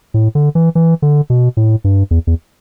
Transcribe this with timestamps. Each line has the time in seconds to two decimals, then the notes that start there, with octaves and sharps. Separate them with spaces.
0.14 A2
0.35 D3
0.55 E3
0.75 E3
1.02 D3
1.30 B2
1.57 A2
1.84 G2
2.11 E2
2.27 E2